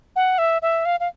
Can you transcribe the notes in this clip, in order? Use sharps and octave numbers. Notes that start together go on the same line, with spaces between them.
F#5
E5
E5
F5
F5